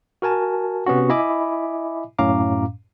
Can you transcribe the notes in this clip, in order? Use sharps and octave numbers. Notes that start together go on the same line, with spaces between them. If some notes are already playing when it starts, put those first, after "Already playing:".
F#4 A#4 G#5 A5
C3 B3 C#4 F#4
E4 D#5 E5 G#5 B5 D6
F#2 A2 C#4 F5 A#5 D6